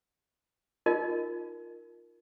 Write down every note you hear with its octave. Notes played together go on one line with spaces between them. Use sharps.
D#4 F4 A#4 D#5